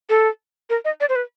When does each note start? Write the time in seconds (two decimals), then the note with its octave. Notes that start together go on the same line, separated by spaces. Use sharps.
0.09 A4
0.70 A#4
0.85 D#5
1.01 D5
1.09 C5
1.16 B4